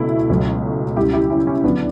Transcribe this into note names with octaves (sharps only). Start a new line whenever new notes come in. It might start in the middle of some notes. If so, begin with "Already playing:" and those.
Already playing: C#2 B2 F#3 A3 E4
C#2 B2 F#3 A3
C#2 C#3 G3 E4 G4
E4 G4
C#4 E4
C#4
D2 D3 F#3 B3 D4